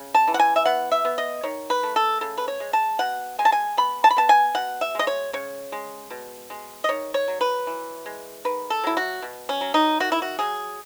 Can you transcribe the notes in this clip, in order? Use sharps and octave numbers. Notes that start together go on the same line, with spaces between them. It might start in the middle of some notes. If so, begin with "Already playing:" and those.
Already playing: C#3
A5
E3
F#5
G#5
E5
B3 F#5
E5
B3
D#5
D#3 C#5
B4
A3
A4
C#3 A4
B4
C#5
G#3
A5
B2 F#5
G#3 G#5
A5
G#5
B3 B5
A5
B5
B3 A5
G#5
B2 F#5
E5
G#3 D#5
C#5
C#3 C#5
G#3
B2
G#3
D#5
D#3 C#5
C#5
F#3
B4
E3
G#3
D#3 B4
A4
F#3 E4
F#4
B2
C#4
F#3
D#4
D#3 F#4
E4
F#4
F#3 G#4